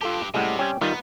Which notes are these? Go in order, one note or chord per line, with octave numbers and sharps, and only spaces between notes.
G2 F4 G4 A4 A5
A2 C3 G3 G#3 C#4 F#5
G3 C#4 G5
D#3 G3 B3 D#4 F4 A#5